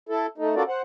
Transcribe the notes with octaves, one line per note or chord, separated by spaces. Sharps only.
E4 A4
A3 D#4
C#4 F4 F#4 A4 A#4 D5
C5 F#5